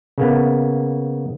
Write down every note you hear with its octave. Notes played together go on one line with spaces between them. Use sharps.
C#3 A#3 B3